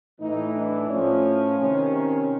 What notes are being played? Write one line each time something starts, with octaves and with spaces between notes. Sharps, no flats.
A2 E3 D#4
D4
A2 F3 C#4
C3 D#3 C#4